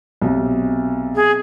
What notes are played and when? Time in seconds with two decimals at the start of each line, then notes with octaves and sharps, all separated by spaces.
0.22 B1 C3
1.15 G#4